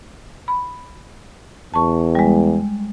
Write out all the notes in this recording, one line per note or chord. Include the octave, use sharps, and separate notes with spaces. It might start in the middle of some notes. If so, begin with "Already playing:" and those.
B5
E2 A5 C#6
G3 G#3